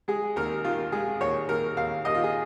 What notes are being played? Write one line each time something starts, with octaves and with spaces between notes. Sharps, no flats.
G#3 G#4
D#2 A#4
D#3 F4
G#3 G#4
D#2 C#5
D#2 A#4
D#2 F5
D#2 D#5
F4
G#4